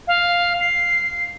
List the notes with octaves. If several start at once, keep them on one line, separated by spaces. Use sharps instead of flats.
F5
C7